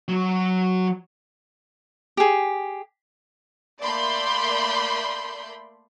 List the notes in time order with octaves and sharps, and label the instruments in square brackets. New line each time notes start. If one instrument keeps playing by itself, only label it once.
[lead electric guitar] F#3 F#4
[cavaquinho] G4 G#4
[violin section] A3 A#3 D5 B5 C6 G6